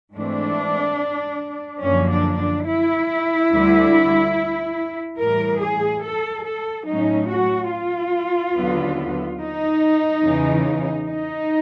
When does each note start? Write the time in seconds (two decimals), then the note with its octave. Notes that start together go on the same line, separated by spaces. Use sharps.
0.13 G#2 E3 A3 C4 D4
1.82 F#2 D3 F3 A#3 C#4
2.11 D4
2.39 D4
2.66 E4
3.51 D2 D3 G3
5.19 A2 E3 G3 A#4
5.61 G#4
6.03 A4
6.44 A4
6.86 A2 F#3 A3 C#4 D#4
7.29 F#4
7.72 F4
8.56 D#2 D3 F#3 B3
9.40 D#4
10.23 E2 C#3 E3
11.08 D#4